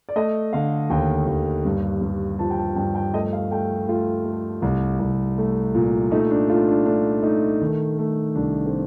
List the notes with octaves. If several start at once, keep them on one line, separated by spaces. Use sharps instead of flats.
D5
A3 D#5
D3 F5
D#2 G5
D#2
G2
G2
F3 A5
G5
A5
G2 G5
G5
A3 D#5
F5
A3 G5
A3 F4
A3
C2
C2
A3
A#2
A3 D#4
D4
A3 F4
D4
A3 D4
A3 D#4
D#3
A3
C2 D4
C4